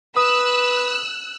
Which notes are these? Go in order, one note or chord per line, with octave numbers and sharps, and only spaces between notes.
B4 D#6 E6 F#6